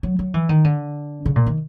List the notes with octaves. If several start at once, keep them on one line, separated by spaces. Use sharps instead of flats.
F#3
F#3
E3
D#3
D3
C#3
A#2
D#3